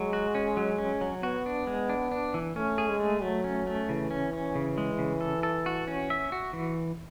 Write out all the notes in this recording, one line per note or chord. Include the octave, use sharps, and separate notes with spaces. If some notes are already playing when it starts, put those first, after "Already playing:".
Already playing: F#3 G#3
F#4
C#4
F#3
C#4
F#3
B3 F#4
D4
G#3
D4
D4
E3
A3 C#4
G#4
G#3
A3
F#3 A3
C#4
A3
C#3 E3
C#4
C#4
C#3
G#3
C#3
A4
A4
F#4
C#4
E5
F#4
E3